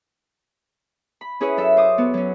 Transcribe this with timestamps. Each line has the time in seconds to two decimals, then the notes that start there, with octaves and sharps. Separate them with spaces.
1.21 B5
1.40 C#4 E4 G#4 B4 C#5
1.57 F#2 A4 E5 E6
1.77 C5 D6 D#6
1.98 B3 F#4
2.14 F#3 C#4